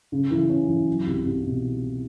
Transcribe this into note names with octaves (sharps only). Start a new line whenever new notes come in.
C#3
E3
C#4
E3
F#3
C2
C2
B2